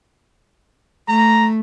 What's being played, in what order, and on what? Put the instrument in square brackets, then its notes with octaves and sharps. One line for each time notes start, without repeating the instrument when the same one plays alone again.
[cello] A3 [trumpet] A#5